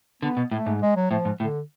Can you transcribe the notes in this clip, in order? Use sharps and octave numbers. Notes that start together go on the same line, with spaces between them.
D3 B3
B2
A2 A3
G#2
G#3
F#3
A2 F3
G#2
A2 D3